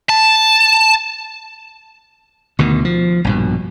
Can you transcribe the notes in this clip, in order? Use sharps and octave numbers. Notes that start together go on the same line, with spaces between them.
A5
D2 B2 D#3
F3
A#1 G2 B2